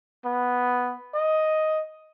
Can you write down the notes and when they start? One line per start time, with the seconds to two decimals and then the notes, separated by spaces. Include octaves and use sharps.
0.25 B3
1.14 D#5